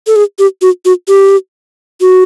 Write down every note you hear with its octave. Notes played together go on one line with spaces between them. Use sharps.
A4
G#4
G4
F#4
F#4
G4
F#4